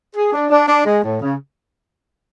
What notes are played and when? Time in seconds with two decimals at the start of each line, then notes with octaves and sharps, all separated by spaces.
0.16 G#4
0.32 D4
0.50 D4
0.68 D4
0.86 G#3
1.04 A2
1.21 C#3